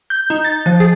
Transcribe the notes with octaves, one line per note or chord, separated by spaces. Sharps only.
G6
D#4
A6
F3
G#4